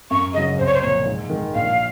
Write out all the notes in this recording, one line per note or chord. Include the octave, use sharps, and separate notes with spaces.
F#2 C#6
C#3 F#3 D#5
C2 C5
C#5
C5
A#2 F3 C#5
G#2
D#3 G#3
A#1 F5